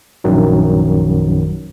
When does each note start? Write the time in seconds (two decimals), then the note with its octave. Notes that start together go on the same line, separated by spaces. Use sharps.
0.24 A#1 F#2 D#3 F#3